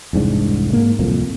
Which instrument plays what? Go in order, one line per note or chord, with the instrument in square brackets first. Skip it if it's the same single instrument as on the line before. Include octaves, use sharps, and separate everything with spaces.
[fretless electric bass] E1 C2 G#2 D4
G#2 A#3
D1 C2 F2 A#3